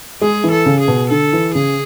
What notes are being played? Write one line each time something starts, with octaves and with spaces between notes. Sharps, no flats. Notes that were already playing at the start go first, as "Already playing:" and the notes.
G#3 G#4
E3
A4
C#3
G#4
B2
D3 A4
E3
C#3 G#4